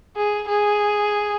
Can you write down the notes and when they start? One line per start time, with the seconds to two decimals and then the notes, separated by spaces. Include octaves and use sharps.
0.16 G#4
0.47 G#4